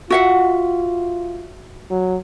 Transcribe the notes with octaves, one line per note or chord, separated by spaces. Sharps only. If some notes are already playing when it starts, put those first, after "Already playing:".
F4 F#4 E5 F#5
F#3